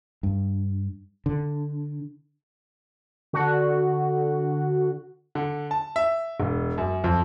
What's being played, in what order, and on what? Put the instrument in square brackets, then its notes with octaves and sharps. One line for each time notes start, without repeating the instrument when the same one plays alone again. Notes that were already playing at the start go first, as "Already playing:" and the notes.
[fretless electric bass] G2
D3
[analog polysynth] D3 F#4
[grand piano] D3
A5
E5
E1
F#2
F2